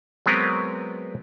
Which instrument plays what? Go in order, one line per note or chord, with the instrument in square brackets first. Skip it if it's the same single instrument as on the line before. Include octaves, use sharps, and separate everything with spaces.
[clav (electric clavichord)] F#3 G#3 B3 C4 A#4 B4